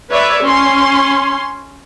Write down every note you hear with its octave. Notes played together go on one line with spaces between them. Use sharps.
B4 C#5 D5 E5
C#4 C6